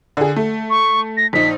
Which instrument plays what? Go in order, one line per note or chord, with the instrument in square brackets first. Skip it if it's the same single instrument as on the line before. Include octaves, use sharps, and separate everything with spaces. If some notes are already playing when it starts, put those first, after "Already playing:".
[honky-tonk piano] D3 G#4
A3
[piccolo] C#6
A#6
[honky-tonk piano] A#1 D#4 [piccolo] B6